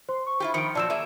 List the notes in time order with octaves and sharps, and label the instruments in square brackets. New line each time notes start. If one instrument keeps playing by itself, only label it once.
[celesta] C5 [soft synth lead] C6
[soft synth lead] C#6
[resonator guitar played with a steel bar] E4 F4 G4
[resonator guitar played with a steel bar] D#3 F3 [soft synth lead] B5 [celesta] C#7 D7
[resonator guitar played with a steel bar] A#2 F3 F#3 [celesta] D5 E6 E7 [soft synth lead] A5
[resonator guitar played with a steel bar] A#3 G#4 E5